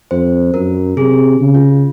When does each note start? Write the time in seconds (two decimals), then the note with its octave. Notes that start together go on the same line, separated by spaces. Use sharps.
0.11 F2 C5
0.54 F#2 A#4
0.97 C3 G#4
1.40 C#3
1.55 F4